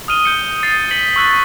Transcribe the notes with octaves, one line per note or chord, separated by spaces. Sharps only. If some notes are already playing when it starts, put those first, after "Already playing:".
D#6 F6 D#7 G7
G6 C#7 G7
D#6 A6 C7
B6 C#7 F#7
C#6 E6 F#6 A6